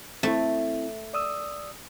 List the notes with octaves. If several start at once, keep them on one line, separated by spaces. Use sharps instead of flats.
A3 C4 E4
D5 D#6 E6